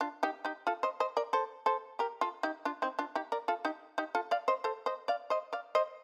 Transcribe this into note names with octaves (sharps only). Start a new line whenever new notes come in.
D4 F4
D#4 G4
D#4 G4
F4 A4
C5 D#5
C5 D#5
A#4 D5
A4 C5
A4 C5
G4 A#4
F4 A4
D#4 G4
D4 F4
C4 D#4
D4 F4
D#4 G4
A#4 D5
F4 A4
D#4 G4
D#4 G4
F4 A4
D5 F5
C5 D#5
A4 C5
C5 D#5
D5 F5
C5 D#5
D5 F5
C5 D#5